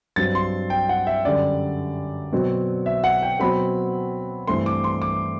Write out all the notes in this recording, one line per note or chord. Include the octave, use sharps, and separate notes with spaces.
G2 F#3 C4 A6
C6
G5
F#5
E5
F#2 D3 G3 D5
B2 F#3 C4
E5
F#5
G5
B2 F#3 C4 B5
G2 E3 A3 C4 C6
D6
C6
D6